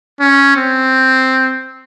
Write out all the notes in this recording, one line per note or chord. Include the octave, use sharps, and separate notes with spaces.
C#4
C4